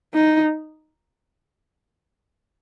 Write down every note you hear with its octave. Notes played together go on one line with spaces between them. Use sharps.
D#4